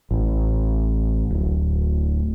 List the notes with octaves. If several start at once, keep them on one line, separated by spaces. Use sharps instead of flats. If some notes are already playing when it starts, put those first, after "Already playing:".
A1
D1